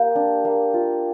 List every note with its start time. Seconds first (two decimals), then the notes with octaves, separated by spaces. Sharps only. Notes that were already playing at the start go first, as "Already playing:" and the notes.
Already playing: A#3 G4
0.16 D4
0.45 A#3
0.74 F4